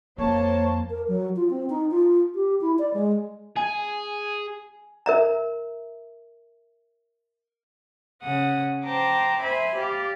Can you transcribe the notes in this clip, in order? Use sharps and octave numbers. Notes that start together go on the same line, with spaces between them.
F2 A#3 C5 C#5 A5
A#4
F#3
F4
C4
D#4
F4
G4
E4
D5
G#3
G#4 G#5
A#4 E5 A#5
C#3 F#5 D#6
C5 G5 A5 A#5 D6
C5 E5 G#5 B5
G4 D5 F5